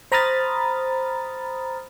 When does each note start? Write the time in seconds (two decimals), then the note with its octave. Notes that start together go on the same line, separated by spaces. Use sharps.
0.12 C5 A#5 B5 D#6 F6 A6